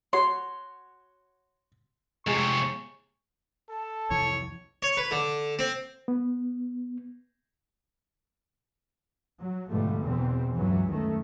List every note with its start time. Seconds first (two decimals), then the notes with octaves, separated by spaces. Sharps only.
0.13 F#4 C#5 C6
2.27 F2 C3 G#3 C#6
3.70 A4 A5
4.11 C2 F2 E3 C#5
4.83 C#5
4.97 B4
5.11 D3
5.59 C4
6.08 B3
9.42 F#3
9.72 G#2 B2 D3 F3 G3 A3
10.02 E2 B2 E3 C4
10.54 C#2 G2 E3 F#3
10.89 F#2 D#3 A3